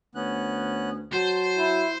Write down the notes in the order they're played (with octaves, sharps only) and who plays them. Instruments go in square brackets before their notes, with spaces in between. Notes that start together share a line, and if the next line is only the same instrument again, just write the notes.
[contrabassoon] D2 [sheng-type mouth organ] B3 C#4 F#6
[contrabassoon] F#3 [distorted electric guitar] C5 [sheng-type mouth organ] A5
[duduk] E4